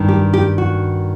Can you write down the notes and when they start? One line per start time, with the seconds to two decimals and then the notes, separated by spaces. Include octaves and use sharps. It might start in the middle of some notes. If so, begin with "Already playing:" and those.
Already playing: G2 D#3
0.09 G4
0.33 G4
0.58 F#4